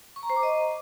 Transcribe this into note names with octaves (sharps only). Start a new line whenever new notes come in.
C#6
A#5
C5
D6
D#5